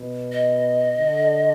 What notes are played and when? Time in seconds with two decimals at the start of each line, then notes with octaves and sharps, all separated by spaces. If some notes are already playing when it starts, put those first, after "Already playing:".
Already playing: B2
0.32 D#5
0.97 D3